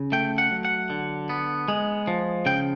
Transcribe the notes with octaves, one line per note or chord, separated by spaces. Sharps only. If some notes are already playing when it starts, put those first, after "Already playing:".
Already playing: C#3
A3 G5
F#5
F#3
F#5
D3
B3
G#3
F3
C#3 G5